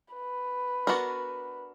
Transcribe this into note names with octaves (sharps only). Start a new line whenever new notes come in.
B4
B3 D4 F#4 A#4 D5